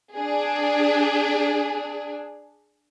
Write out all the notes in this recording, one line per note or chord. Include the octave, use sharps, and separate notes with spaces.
D4 G#4